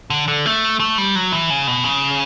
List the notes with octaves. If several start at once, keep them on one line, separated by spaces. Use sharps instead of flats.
D3
D3
A3
A3
G3
F#3
E3
C#3
B2
C#3